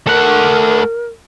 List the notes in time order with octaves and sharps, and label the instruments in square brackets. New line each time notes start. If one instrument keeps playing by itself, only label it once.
[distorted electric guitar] A3 F#5 [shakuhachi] A#4